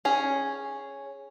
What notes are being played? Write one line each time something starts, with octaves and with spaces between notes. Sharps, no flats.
C#4 G#4